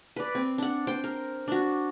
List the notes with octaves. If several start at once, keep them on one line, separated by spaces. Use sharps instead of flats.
B4 D5
C4
D4 F#5
C5 G5
A#4
D4 F#4